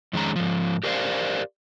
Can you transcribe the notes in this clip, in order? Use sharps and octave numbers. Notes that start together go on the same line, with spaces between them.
F2 D#3 G#3 C#4 A#5
G#2 F3
G4 A#4 C5 D5 F5